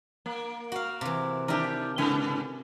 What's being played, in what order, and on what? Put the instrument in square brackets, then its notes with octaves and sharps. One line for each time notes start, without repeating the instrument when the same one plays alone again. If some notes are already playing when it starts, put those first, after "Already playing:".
[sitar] A#3
[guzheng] F#4 F5
C3 E3
[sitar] D#3 D4 G4 [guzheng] A#4 E5
[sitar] G#2 C#3 B4 [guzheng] G#5